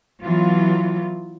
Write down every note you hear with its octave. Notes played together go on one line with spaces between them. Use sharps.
E3 F#3 B3 F4